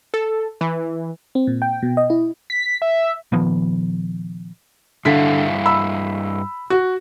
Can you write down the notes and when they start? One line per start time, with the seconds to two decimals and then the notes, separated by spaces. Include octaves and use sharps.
0.14 A4
0.61 E3
1.35 C4
1.47 A#2
1.62 G5
1.82 B2
1.97 D#5
2.10 E4
2.50 B6
2.82 E5
3.32 A#2 D#3 F3 B3
5.05 G2 D3 E4 F5 B6
5.65 B5 E6
6.70 F#4